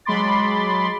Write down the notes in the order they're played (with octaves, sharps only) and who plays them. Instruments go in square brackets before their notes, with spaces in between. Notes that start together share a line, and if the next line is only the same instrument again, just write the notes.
[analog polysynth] F#3 G#3 B5 C6 D6 A6